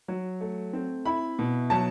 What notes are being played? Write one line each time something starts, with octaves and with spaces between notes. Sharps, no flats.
F#3
A3
C4
E4 B5
B2
F#3 A5